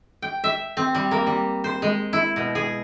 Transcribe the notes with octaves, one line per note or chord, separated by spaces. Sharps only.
G5
E5
C4
G3
A#3
G3
C5
G#3
E4
B2
G#4